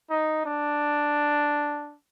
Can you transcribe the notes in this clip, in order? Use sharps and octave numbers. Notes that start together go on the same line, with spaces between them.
D#4
D4